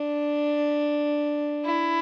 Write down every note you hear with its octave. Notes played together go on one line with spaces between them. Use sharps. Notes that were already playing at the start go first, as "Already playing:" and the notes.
Already playing: D4
E4